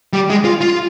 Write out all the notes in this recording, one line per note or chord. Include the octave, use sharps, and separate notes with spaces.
G3
G#3
F4
F4